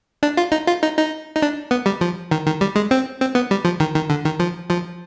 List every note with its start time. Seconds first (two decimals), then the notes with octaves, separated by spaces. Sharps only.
0.23 D4
0.37 F4
0.52 D#4
0.67 F4
0.83 D#4
0.98 D#4
1.36 D#4
1.42 D4
1.71 B3
1.86 G3
2.01 F3
2.31 D#3
2.46 D#3
2.61 G3
2.76 G#3
2.91 C4
3.21 C4
3.35 B3
3.51 G3
3.65 F3
3.80 D#3
3.95 D#3
4.10 D3
4.25 D#3
4.39 F3
4.70 F3